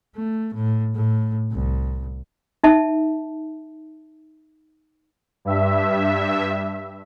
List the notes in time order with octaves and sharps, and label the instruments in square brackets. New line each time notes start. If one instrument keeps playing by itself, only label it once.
[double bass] A3
A2
A2
C2
[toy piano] D#4 E5 A5
[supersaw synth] G2 E5